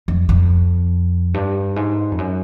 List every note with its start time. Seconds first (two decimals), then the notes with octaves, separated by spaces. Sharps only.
0.08 F2
0.29 F2
1.34 G2
1.76 G#2
2.12 F2
2.18 F#2